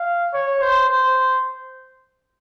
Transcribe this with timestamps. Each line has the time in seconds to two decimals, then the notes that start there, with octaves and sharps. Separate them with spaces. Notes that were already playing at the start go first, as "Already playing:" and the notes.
Already playing: F5
0.33 C#5
0.61 C5
0.89 C5